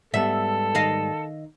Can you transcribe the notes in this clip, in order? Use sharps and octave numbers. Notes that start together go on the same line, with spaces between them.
G#2 G3 B3 A4 E5
D#3 D#5 F5